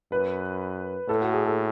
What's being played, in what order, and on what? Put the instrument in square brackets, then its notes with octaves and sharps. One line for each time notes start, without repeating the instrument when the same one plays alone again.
[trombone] F#2 [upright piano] B4
[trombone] A2 [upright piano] A4
[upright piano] F#4
G#4
A4